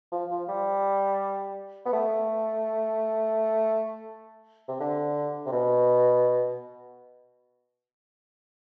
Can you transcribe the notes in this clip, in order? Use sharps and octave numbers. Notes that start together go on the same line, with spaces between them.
F3
F3
G3
B3
A3
C3
D3
C3
B2